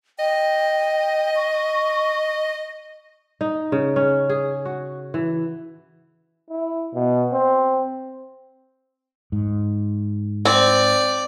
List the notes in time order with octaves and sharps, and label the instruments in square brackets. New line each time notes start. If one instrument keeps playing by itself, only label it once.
[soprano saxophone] D#5 [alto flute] G5
[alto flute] C#6
[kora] D#4
C#3
C#4
G#4
F#4
E3
[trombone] E4
B2
C4
[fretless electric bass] G#2
[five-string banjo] C4 [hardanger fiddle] D5